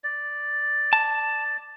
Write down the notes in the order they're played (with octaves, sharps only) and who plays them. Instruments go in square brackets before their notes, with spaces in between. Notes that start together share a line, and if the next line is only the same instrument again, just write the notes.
[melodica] D5
[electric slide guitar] A5